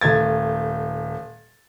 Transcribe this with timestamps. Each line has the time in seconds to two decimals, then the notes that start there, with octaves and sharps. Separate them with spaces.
0.01 D#1 A3 G#6 A6